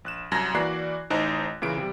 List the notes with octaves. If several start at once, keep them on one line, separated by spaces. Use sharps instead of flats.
A#1 F#6 E7
C2 F#2 A5 G#6 A#6
E3 A#3 F#4 D5 F#6 C7
A1 D#4 C5 D#5 A5 F#6
A#2 C#3 E3 D7
C3 G3